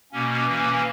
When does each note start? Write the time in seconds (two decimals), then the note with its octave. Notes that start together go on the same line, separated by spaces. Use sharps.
0.12 B2 A#3 C#4
0.47 E3 A#3 C#4